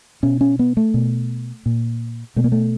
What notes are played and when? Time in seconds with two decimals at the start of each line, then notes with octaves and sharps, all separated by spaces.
0.23 B2 C#4
0.41 C#4
0.59 B3
0.77 A3
0.94 B2
1.66 A#2
2.36 B2 A3
2.44 A#3
2.52 A3